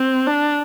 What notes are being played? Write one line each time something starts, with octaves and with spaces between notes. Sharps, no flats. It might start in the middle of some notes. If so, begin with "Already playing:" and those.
Already playing: C4
D4